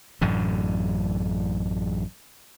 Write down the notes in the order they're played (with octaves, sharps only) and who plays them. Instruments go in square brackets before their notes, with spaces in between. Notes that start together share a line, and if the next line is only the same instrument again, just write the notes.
[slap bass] A1 F#2 A2 D3